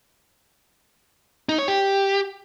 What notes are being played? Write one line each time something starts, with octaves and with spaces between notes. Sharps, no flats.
D#4
C#5
G4